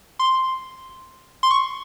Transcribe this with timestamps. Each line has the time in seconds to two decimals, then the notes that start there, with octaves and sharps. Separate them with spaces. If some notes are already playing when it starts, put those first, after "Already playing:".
0.19 C6
1.43 C6
1.51 C#6